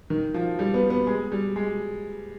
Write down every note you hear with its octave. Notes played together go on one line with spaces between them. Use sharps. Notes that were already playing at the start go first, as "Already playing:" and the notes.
D#3
F3
G3
B3
B3
G#3
G3
G#3